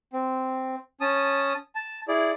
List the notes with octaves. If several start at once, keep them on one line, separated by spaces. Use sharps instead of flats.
C4
C#4 A5 D#6
A5
E4 G#4 D5